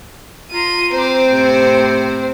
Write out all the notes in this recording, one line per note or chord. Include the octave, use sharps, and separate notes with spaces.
F4 A#5 C6 D#7
C4 C5 A#5 D6
A2 C3